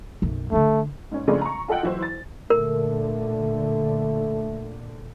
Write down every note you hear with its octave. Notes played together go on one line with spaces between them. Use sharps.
B1 F#2
D3 A3 D4
G#2 C#4
C#3 F3 G#3 A3 C4 D4
A#5 C#6
F4 A4 D#5 F#5 G5
E3 F#3 E4 F#4 C5
A6
A#2 D3 A3 A#4